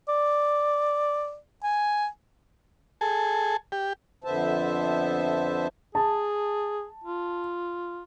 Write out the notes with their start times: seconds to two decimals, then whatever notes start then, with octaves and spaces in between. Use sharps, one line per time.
0.08 D5
1.63 G#5
3.01 G#4 A4
3.72 G4
4.24 F2 D3 B3 C5 E5 A5
5.95 G#4 A5
7.04 F4